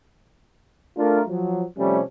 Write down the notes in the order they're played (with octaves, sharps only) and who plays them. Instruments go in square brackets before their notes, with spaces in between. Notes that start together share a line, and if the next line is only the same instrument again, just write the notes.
[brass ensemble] A3 D4 F4 A#4
F3 F#3
C3 F3 G3 A3 C#4